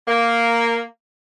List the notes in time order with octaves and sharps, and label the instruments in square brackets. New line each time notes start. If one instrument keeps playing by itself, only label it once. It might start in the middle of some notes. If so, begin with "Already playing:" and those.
[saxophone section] A#3